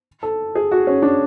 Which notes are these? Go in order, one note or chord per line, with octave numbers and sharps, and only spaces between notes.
A4
G#4
F#4
C#4
D4